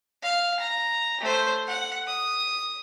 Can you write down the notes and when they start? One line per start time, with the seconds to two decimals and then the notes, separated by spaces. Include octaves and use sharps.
0.22 F5
0.60 A#5
1.21 A3 C5
1.67 F#5
2.07 D#6